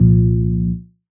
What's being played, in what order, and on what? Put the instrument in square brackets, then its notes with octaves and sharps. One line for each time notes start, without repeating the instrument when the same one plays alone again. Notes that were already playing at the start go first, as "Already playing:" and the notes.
Already playing: [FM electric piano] C2 A#2 F3